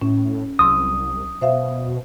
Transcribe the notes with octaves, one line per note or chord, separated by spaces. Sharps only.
A2 C#4
C2 F#3 C6 D#6 E6
B2 C5 E5 F5